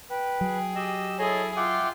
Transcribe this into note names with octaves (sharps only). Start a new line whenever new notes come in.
B4 G5
F#3 G#4
G4 D#5 E6
E4 G#4 A4 C#5 D#5
F4 E5 F#5 G5 D6